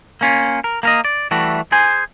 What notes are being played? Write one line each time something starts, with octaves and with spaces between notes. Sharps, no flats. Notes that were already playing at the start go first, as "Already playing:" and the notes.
A#3 C#4 F4
A#4
A#3 A#4 D#5
D5
E3 G3 A3 F#4
G#4 C5 G#5